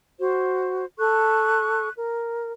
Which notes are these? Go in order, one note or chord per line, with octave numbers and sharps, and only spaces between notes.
F#4 C5
A4 C#6 F#6
A#4